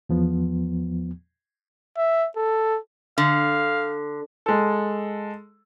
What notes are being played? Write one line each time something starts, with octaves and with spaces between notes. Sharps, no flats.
E2 F3 B3
E5
A4
D3 F5
G#3 A4